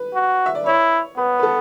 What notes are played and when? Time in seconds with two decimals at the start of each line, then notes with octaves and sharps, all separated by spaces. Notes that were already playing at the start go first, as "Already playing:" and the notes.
Already playing: B4
0.14 F#4
0.46 E5
0.55 D5
0.66 E4 C#5
1.17 B3 B4
1.39 B4
1.43 A4